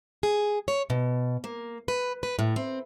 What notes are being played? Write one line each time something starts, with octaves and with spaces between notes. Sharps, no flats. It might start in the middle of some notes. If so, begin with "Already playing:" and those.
G#4
C#5
B2
A#3
B4
B4
A2
C4